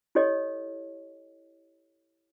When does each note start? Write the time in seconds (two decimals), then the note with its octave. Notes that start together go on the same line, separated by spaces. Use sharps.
0.15 E4 G4 A4 C#5 D#5